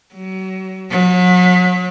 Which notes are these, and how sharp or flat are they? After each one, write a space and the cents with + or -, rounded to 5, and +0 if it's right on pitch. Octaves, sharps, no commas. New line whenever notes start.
F#3 +35
F#3 -40